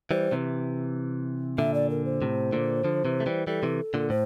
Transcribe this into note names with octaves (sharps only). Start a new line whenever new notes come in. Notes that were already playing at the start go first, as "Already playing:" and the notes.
E3 G3 C5
C3 E3
A#2 D3 E5
D5
A#4
C5
A2 C3
A#2 D3
D3 F3
C3 E3
A3
E3 G3
E3 G3 A4
C3 E3
A#2 D3
A2 C5